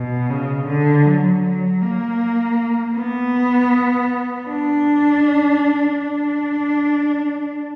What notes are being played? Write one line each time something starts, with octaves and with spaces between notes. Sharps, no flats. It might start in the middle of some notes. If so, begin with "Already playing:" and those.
Already playing: B2
C#3
D3
F#3
F#3
A#3
B3
D4
D4